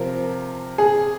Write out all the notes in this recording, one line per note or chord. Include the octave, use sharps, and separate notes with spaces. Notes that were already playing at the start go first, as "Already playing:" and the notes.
Already playing: C3 F3 C4 A#4
G#4